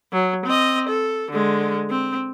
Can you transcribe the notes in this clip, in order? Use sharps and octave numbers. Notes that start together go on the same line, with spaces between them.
F#3
C4 D#5
A4
D3 G#3
C4